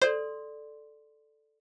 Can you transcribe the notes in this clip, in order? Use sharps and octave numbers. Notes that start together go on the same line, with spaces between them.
A4 C5 D5 C6